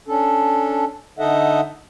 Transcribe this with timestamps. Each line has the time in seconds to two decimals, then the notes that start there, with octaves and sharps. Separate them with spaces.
0.08 C#4 D4 A4
1.19 D3 D#4 A4 D#5 E5 F#5